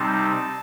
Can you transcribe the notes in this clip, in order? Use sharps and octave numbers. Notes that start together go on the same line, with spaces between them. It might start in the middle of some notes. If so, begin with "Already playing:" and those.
Already playing: C3 G3 C4 D#4 A5